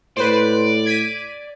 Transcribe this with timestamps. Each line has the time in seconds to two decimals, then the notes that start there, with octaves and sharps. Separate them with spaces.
0.17 A2 B4 C5 D5
0.86 G#6 B6 D#7